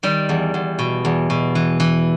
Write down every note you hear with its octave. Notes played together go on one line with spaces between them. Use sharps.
D#3 G3
E2
E2
B2
E2
B2
E3
E3